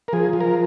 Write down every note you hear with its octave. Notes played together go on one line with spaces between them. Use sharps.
A#4
F3 G#4
F3
A#4